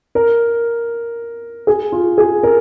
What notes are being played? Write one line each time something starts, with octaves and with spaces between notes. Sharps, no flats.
A#4
G#4
F4
G#4
A#4